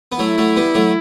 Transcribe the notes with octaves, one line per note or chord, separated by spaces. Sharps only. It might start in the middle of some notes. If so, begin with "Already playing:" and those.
B3
F#3 A3 E4
F#3 A3
G3 B3
F#3 A3